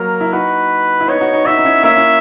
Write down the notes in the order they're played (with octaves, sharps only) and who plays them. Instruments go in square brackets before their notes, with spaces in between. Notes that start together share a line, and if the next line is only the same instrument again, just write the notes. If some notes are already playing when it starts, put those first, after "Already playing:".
Already playing: [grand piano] F#3 A#3 [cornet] A#4
[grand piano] E4
[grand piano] D#4 F#4 [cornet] B4
[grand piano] E4
[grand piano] B3 D#4 [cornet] C#5
[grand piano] D#4 F#4
B3 D#4
[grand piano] D#4 F#4 [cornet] E5
[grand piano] D#4
C#4 E4
[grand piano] A#3 C#4 [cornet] E5
[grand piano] C#4 E4